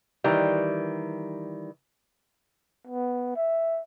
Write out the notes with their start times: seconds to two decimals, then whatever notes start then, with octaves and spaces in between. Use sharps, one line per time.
0.24 D#3 E3 G3
2.87 B3
3.36 E5